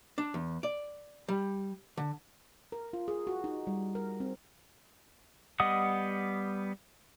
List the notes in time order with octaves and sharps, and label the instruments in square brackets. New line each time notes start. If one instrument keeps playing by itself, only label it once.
[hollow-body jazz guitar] D4
E2
D5
G3
D3
[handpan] A#4
F4
G#4
F#4
D#4
G3
A#4
C4
[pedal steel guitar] G3 B3 D#5 F#5 D#6